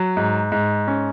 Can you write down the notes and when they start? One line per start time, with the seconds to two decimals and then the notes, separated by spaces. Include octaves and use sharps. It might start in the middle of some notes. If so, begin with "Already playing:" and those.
Already playing: F#3
0.17 G#2
0.52 G#2
0.88 C#4